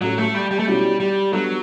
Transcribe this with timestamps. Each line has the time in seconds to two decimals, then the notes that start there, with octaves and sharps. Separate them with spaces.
0.01 A2 F#3 G3 C#4 F#4 A4
0.18 A3
0.35 G3
0.51 G3
0.59 A3
0.67 B2 F#3 G3 C#4 E4
1.00 G3
1.32 F#3 G3 B3 D4 A4